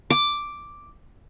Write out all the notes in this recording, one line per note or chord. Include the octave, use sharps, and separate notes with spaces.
D6